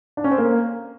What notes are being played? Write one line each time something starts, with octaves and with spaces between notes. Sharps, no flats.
D4
C#4
C4
A#3